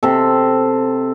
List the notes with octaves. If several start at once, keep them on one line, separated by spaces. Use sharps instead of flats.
C3 A4